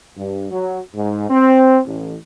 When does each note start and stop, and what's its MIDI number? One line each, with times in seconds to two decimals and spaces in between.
0.17 0.49 43
0.51 0.80 54
0.94 1.28 44
1.30 1.79 60
1.86 2.15 33